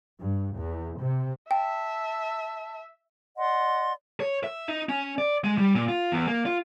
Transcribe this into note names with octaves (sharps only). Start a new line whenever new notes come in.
G2
E2
C3
E5 G5 A5
D5 D#5 F#5 C6
C#5
E5
D#4
C#4
D5
G#3
G3
A#2
F4
E2
A#3
F4